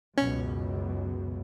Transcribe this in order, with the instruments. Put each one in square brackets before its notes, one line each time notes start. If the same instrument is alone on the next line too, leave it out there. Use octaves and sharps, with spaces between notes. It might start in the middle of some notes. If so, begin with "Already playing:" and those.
[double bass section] C#2 F#2 B2 [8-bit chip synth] C#4